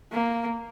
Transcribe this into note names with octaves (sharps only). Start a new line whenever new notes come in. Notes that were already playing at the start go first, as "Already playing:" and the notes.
A#3